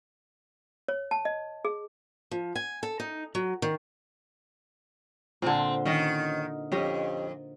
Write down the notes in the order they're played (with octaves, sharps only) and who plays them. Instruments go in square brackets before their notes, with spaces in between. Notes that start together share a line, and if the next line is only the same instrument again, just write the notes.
[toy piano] C#5
A5
D#5
G#4
[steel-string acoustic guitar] F3
G#5
A4
D#4
F#3
D#3
[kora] A#2 D3 [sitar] C4
[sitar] D#3 [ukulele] C#4 D#5 G5
[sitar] F2 [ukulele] C#4 G4 D#5